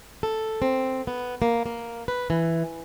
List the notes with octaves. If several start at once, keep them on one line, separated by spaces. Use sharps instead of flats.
A4
C4
B3
A#3
A#3
B4
E3